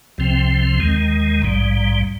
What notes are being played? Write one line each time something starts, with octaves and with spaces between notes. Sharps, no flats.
C2 C3 F3 C4
D#2 D#3 G#3
A#1 G#2 G3